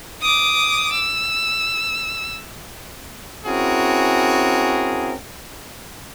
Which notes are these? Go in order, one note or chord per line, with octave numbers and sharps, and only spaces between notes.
D6 D#6
E6
C4 C#4 E4 F#4 G#4 A#4